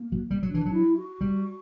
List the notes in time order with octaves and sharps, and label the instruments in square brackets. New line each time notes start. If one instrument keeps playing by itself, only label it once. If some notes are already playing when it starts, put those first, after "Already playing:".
Already playing: [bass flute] A#3
[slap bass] F#3
G3
F#3
[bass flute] D4
[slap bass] E3
F#3
[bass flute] E4
F#4
[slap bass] G3